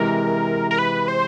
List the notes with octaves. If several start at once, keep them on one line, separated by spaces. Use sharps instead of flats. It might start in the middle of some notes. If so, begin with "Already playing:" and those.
Already playing: C3 E3 G#3 A#4
A#4
B4
C5